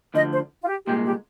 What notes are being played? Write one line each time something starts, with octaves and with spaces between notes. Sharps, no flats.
D2 D3 F3 D#5
C5
F4
G4
C2 A#2 G#3 G4
G4